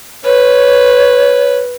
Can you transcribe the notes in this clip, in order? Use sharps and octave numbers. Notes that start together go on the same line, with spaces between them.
B4 C#5